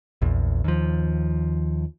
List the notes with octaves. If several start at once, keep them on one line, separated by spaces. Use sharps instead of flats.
A#1 E2
D#2 F3